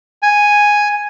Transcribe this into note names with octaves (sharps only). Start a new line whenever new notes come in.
G#5